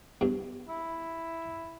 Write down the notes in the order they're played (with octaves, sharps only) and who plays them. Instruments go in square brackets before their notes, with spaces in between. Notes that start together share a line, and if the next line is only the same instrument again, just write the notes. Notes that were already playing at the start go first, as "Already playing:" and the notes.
[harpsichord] E2 G2
[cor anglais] E4